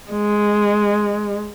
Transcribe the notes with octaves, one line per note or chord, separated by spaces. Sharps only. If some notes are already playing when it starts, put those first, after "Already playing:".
G#3